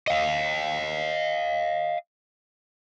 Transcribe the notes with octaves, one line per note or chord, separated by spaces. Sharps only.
D#5 F5